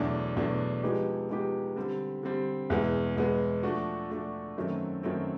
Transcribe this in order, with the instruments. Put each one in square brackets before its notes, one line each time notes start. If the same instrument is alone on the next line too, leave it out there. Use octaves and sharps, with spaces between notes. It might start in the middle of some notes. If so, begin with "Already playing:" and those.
Already playing: [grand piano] E2 B2 F#3 A3 D4
E2 B2 F#3 A3 D4
F3 G#3 B3 D#4 G4
F3 G#3 B3 D#4 G4
D3 G3 C4
D3 G3 C4
E2 B2 G#3 B3
E2 B2 G#3 B3
F3 A3 D4 F#4
F3 A3 D4 F#4
F#2 D#3 F#3 A3 C4
F#2 D#3 F#3 A3 C4